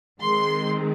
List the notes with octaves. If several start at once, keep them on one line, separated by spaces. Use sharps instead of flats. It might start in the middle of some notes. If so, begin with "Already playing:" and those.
D#3 G#3 C4 C6